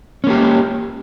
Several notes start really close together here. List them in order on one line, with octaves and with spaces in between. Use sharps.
C#4 A#3 G4